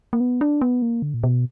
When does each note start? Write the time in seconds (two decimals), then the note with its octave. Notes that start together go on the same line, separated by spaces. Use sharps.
0.13 A#3
0.20 B3
0.41 D4
0.61 B3
0.82 A#3
1.02 D3
1.14 A#2
1.23 B2